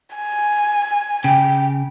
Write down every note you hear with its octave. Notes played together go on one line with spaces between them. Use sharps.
G#5
C#3 G5